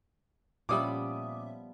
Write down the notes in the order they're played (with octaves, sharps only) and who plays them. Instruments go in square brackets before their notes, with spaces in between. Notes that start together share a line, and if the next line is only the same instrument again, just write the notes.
[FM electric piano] A#2 C#4 E5 [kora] F3 G3 B3 [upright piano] D6 D#6